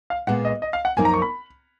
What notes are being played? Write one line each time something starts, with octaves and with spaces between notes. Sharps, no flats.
F5
A#2 G#3 B3 F4 F#5
D#5
D#5
F5
F#5
F#2 F3 A#3 D#4 G#5
A#5
C#6
B5